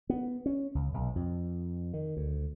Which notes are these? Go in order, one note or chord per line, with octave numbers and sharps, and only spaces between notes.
B3
C#4
C#2
B1
F2
D#3
D2